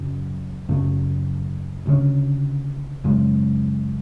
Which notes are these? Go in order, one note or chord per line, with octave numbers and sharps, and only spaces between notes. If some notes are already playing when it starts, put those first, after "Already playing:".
Already playing: F#2 C#3 F#3
F#2 C#3 F#3 A3
D2 C#3 G#3 C#4
F#2 C#3 G#3